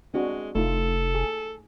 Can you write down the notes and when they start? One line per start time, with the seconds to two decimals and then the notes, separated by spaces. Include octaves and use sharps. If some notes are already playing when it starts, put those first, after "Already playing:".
0.14 G#3 C4 D4 F#4
0.55 F1 A3 D#4 F4 A4
1.15 G#4